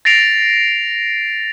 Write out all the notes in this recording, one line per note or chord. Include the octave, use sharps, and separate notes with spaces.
A6 A#6 C7 D7 F7